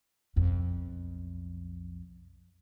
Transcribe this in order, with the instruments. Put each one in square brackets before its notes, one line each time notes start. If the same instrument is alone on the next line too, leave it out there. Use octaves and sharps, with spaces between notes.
[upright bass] B1 F2